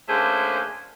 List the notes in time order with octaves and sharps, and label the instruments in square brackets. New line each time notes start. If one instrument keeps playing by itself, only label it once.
[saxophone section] D3 A3 A#3 C#4 G#4 C5